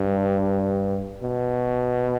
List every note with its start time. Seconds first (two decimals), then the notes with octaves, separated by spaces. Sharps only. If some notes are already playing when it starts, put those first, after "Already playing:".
Already playing: G2
1.23 B2